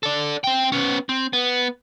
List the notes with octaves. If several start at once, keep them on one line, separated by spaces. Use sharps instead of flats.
A4 D5
C4 G5
B3 C#4
C4
B3